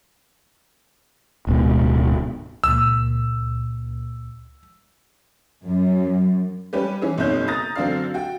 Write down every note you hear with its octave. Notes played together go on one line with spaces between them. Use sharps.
D1 G#2 B2
C#2 A#2 E6
F#2
G3 C#4 G4 B4
E3 C#4 G#4
F#1 C2 B2 D#4 C#5 G6
A#5 D#6 A6 A#6
F#2 D3 F#3 C4 D4 F5
F#4 G5